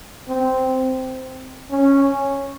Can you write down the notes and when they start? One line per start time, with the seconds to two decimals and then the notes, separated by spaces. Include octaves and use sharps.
0.28 C4
1.71 C#4